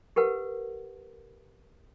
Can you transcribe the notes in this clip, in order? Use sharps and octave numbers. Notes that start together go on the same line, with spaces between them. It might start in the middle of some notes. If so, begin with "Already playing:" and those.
G4 A#4 B4 F#5